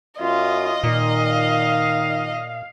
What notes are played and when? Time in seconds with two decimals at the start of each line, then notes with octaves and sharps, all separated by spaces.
0.21 F#2 F4 D#5
0.83 A#2 D#3 F5